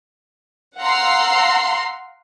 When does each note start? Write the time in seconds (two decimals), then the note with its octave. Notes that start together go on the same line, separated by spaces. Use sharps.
0.78 F5 F#5 A#5 C6 E6 C7